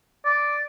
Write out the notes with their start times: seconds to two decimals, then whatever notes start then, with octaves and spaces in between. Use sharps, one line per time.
0.25 D5